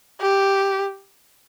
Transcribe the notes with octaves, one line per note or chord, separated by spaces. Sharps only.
G4